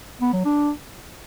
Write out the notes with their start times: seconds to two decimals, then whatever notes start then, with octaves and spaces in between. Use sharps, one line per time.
0.21 B3
0.33 F#3
0.45 D4